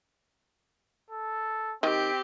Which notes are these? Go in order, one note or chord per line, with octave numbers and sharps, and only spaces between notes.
A4
D#3 C4 G4